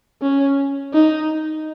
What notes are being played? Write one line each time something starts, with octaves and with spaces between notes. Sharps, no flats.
C#4
D#4